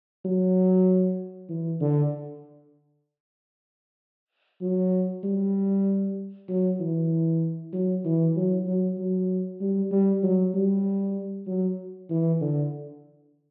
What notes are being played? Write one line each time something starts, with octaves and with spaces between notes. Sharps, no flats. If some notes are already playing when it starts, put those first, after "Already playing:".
F#3
E3
D3
F#3
G3
F#3
E3
F#3
E3
F#3
F#3
F#3
G3
G3
F#3
G3
F#3
E3
D3